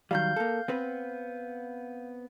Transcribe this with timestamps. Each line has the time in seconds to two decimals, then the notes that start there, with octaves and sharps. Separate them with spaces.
0.11 D#3 F#3 G3 F5 G6
0.36 A#3 A4
0.68 B3 C4 B4